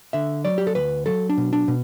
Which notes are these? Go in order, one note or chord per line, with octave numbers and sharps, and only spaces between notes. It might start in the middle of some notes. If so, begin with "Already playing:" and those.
D3 E5
F#3 D5
G4
A4
D2 B4
F#3 A4
D4
B2
D4
B2